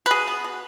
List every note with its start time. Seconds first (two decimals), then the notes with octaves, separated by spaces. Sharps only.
0.06 B4
0.11 B2 G#4
0.27 B3
0.44 B2